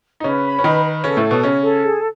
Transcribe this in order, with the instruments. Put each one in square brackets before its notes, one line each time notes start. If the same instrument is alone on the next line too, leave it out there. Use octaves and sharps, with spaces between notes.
[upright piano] D#4
[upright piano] C#3 C#4 [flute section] B4
[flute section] B5
[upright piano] C#4
[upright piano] D#3 D#4 [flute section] B4
[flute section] B4
[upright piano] C#3 C#4 [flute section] A4
[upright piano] A2 A3
[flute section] C#5
[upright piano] B2 B3
[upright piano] C#3 C#4 [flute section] C#5
[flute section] A4
G#4